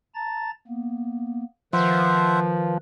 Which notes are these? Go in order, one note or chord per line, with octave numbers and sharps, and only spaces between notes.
A5 A#5 A6
A#3 B3
D#3 F3 B4 C5 E5 F#5